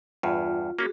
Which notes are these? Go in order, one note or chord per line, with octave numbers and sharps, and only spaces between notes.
E2 G2 F4
A#3 C#4 F#4 G#4